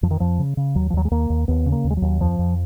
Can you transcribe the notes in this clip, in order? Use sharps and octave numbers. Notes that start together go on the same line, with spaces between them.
F2 F3
D#3
F2 F3
C#3
C#3
D#2 F#3
F3
D#2 F#3
G#3
D#2 A#3
D#2
D#2 B3
C#3
A#3
D#2
G#3
D#2 F#3
F2 F3
F2